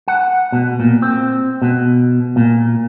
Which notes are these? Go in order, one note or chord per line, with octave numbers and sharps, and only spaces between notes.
F#5
B2
A#2
C4
B2
A#2